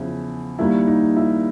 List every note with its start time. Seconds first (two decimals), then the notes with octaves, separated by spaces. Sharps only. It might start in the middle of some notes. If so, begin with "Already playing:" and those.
Already playing: E2 C#3 F3 E4
0.59 D#2 D#3 G3 A#3 E4
0.88 D#4
1.17 E4